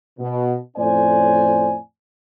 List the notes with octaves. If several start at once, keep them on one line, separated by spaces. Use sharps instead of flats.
B2
F2 A2 C#4 C5 D5 G#5